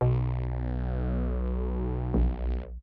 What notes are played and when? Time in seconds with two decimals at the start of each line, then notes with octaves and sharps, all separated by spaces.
0.01 B1 B2
2.14 A#1